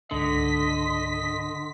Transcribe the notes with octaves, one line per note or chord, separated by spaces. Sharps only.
C#2 G#2 D3 D#5 B6